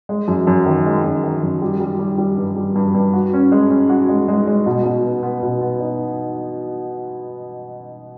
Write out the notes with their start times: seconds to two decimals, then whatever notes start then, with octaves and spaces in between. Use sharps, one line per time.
0.09 G#3
0.28 F#2
0.47 F#2
0.66 D#3
0.85 G#3
1.04 F#2
1.24 D#3
1.42 F#2
1.62 G3
1.80 G3
1.99 G3
2.18 G3
2.37 G2
2.56 G3
2.76 G2
2.95 G2
3.13 F#4
3.33 C#4
3.52 G#3
3.71 C#4
3.89 F#4
4.09 G#3
4.28 G#3
4.47 G#3
4.66 B2
4.85 B2
5.04 B3
5.23 B3
5.43 B2
5.61 B3
5.80 D#4